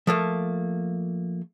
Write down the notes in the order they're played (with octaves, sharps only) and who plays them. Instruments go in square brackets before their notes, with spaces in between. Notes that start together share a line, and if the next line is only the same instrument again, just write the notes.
[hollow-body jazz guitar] F3 A3 A#3